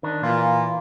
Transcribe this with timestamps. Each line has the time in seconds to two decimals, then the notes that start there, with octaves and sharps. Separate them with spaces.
0.03 D#3 D4
0.23 A#2 E3 F4